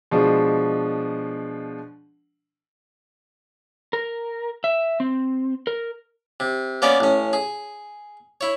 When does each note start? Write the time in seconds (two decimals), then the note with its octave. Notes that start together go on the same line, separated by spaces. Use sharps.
0.11 B2 F3 G#3 D4
3.93 A#4
4.64 E5
5.00 C4
5.67 A#4
6.40 C3
6.82 A#3 B3 C#4 C#5 D5
7.00 A1 C#4
7.33 G#4
8.41 E4 C#5